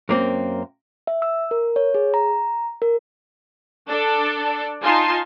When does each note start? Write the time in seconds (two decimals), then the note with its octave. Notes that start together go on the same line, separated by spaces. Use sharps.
0.09 F#2 A#3 C4
1.07 E5
1.22 E6
1.51 A#4
1.76 C#5
1.94 G#4
2.14 A#5
2.82 A#4
3.88 D4 A4 D5
4.82 D#4 F4 G#5 A5 C6